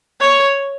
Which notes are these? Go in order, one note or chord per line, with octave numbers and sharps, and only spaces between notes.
C#5